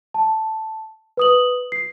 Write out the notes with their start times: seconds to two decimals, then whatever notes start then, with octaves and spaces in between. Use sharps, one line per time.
0.14 A5
1.17 B4 D#6 F#7
1.72 C7